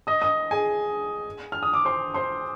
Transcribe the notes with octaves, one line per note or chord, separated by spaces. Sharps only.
D#5 D#6
D#5 D#6
G#4 G#5
F6
D#6
D6
C5 C6
C5 C6